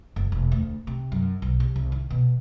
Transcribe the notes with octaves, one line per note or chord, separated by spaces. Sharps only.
F#1
E1
D2
C3
F#2
B1
C3
C2
D#3
B2